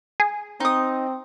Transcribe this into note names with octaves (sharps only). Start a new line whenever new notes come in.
G#4
C4 D#4 D#6